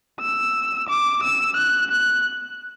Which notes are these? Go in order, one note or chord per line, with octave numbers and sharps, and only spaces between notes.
E6
D6
E6
F#6
F#6